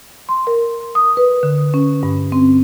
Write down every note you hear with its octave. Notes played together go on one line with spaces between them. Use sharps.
C6
A#4
D#6
B4
D3
C#4
G2
C4